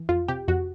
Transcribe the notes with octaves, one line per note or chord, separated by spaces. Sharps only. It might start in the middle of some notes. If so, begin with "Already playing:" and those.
Already playing: E3
F2 F4
C3 G4
F2 F#4